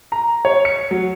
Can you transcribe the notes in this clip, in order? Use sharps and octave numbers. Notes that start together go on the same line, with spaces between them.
A#5
C#5
C#7
F#3